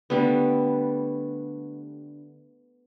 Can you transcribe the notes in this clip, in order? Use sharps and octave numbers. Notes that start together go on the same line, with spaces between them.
D3 G3 A3 B3